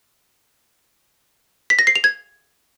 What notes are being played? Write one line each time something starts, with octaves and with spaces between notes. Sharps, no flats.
B6
A#6
C7
F7
G#6